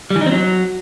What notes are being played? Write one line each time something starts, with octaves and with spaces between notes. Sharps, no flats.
G3
E3
D#4
C4
F#3